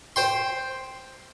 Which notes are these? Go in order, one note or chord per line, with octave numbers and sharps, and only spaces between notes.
C5 G5 C6